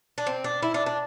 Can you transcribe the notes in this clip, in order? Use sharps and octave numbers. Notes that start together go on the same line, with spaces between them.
D4
C4
D4
E4
D4
D4